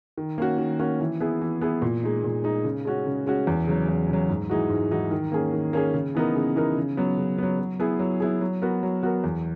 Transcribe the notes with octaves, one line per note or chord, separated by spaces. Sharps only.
D#3
A#3 C#4 F#4
D#3
A#3 C#4 F#4
E3
B3 E4 G#4
E3
B3 E4 G#4
A#2
G#3 D#4
A#2
G#3 D#4
C#3
G#3 C#4 F#4
C#3
G#3 C#4 F#4
E2
C#3 F#3
E2
C#3 F#3
G#2
E3 G#3 D#4 F#4
G#2
E3 G#3 D#4 F#4
D#3
A#3 C#4 G#4
D#3
A#3 C#4 G#4
C#3
E3 B3 D#4 A#4
C#3
E3 B3 D#4 A#4
C#3
F#3 B3
C#3
F#3 B3
F#3
B3 E4 G#4
F#3
B3 E4 G#4
F#3
B3 F#4 A#4
F#3
B3 F#4 A#4
E2